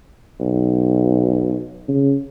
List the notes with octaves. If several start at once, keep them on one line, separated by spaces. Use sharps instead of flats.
B1
C#3